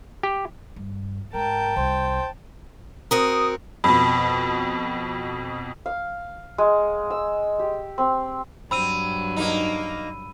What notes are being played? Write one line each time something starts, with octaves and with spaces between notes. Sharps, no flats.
G4
G2
G#2 A#4 G5 A5
C2 C5
C4 F#4 A#4 D#6
F2 B2 B5
F5
G#3
E6
G4
C4
G2 F#3 C4 B5 E6 D#7
A#3 D#4